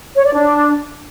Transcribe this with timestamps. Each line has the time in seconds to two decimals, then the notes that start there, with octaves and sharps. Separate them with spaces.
0.16 C#5
0.25 D5
0.34 D4